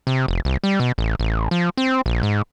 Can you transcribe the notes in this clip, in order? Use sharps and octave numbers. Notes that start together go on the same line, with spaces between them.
C3
F1
C2
G3
B2
A1
A1
F3
C4
A#1
G#2